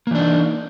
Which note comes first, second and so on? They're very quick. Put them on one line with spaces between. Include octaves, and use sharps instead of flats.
A#3 E3 D4 D#4